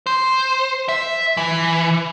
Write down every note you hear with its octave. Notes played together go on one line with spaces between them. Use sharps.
C5
E5
E3